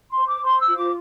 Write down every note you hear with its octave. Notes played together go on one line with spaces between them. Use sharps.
C6
C5
D6
C5 C6
E6
F4
D6